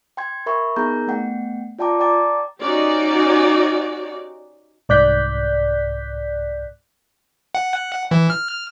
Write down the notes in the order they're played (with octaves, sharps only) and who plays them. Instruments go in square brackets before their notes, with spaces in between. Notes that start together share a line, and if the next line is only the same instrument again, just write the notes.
[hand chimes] G5 C6 G#6
A#4 E5 B5 C#6
B3 D#4 G#4 A#4 A#5 G6
A3 B3 F#5 G5
F4 D5 G5 A5 A#5 D6
D5 G5 A5 A#5 D6 A6
[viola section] C#4 D#4 F#4 G4 D5
[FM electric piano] C2 G#2 D5 F#6 G6 B6
[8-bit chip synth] F#5
E3
F6